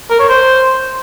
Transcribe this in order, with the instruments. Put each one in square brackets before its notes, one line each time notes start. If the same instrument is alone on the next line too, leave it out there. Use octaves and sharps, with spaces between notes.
[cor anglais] A#4
C#5
C5